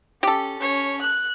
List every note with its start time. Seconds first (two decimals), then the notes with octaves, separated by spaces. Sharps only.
0.23 C#4 G4 A4
0.59 C#4 C#5
1.02 F#6